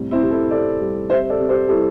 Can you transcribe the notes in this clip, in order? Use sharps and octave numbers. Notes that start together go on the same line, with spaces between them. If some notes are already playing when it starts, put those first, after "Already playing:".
Already playing: A2 C3 G3
C4 E4
C3
E4 A4
C3 A4 D5
G3
C3 C5 E5
A4 D5
C3
G4 C5
G3 E4 A4